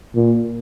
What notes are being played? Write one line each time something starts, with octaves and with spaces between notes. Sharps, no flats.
A#2